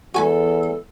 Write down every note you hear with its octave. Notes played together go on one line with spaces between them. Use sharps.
E2 F#4 A4 G#5 B5